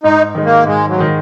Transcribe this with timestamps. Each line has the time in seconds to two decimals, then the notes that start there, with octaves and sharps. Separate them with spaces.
0.03 G#2 D#4
0.35 D#3 G#3
0.45 A#3
0.67 G#2 G#3
0.88 F#3
0.98 D#3 G#3